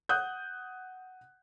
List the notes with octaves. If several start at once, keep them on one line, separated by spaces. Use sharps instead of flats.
F#5 D#6 F#6 G6